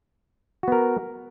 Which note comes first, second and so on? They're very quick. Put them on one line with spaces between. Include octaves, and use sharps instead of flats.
F#4 B3 A#4